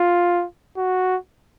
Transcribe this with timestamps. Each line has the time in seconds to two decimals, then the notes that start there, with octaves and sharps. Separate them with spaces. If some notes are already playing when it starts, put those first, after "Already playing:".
Already playing: F4
0.77 F#4